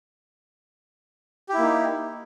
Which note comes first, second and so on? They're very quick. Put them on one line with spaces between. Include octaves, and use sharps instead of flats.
G4 E4 A#3 D#4